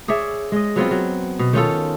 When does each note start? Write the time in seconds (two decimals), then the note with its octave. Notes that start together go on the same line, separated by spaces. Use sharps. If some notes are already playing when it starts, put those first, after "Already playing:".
0.08 G#4 C#5 D5 E5
0.52 G#3 D#5
0.76 F#3 B3 C4 F4
0.91 F#3
1.39 B2
1.53 D#3 C#4 F4 A4